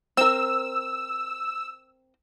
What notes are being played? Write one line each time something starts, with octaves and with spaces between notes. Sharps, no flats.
C4 A#4 E6